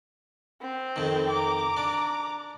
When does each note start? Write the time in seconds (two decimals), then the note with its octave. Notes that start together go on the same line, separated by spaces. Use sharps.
0.61 C4
0.96 F2 D#3
1.30 A#5 D6
1.77 D4